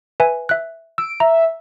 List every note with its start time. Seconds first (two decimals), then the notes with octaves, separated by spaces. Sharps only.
0.20 B4 E5 G#5
0.49 E5 F#6
0.98 E6 D7
1.20 E5 A#5